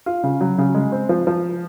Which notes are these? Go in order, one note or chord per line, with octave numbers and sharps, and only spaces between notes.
F4
C#3
F#3
C#3
G#3
C4
F3
F3